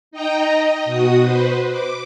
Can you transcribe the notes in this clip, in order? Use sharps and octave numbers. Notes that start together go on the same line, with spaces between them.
D#4 D#5 G5 A#5
D#5
B2 F#4 D#6
B4 C5
D6